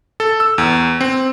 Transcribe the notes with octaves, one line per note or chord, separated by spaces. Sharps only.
A4
E6
E2
C4